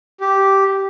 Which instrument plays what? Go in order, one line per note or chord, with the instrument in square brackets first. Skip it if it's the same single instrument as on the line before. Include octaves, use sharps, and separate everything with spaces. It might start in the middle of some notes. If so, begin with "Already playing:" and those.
[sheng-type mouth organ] G4